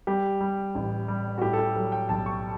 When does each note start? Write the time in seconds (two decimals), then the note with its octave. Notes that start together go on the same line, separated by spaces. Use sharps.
0.07 G3 G4
0.41 G3
0.75 A1
1.08 G3
1.38 F#4
1.42 A2 G4
1.53 A4
1.59 G4
1.76 F#3 A4
1.92 G5
2.09 B1 A5
2.26 C#6